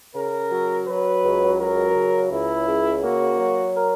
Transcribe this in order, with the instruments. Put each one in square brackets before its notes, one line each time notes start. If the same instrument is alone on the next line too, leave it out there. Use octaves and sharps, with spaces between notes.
[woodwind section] C#3 [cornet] A#4
[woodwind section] F#3
[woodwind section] F#3 [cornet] B4
[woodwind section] C#2
[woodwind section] F#3 [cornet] A#4
[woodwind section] C#3
[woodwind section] C#2 [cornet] E4
[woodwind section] C#3
[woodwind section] A#3 [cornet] F#4
[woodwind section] F#3
A#4